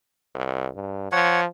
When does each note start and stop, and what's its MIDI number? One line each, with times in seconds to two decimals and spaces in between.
0.35 0.67 36
0.75 1.12 43
1.12 1.45 53
1.12 1.41 73
1.12 1.41 78